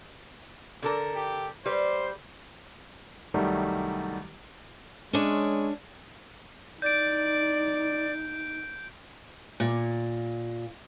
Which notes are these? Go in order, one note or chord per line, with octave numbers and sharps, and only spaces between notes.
D3 A4 A#4
G4
G3 B4 C5
C2 D#3 F#3 G3 A3
G#3 C#4 D4 C#5
D#4 D5 G6 D7
A#2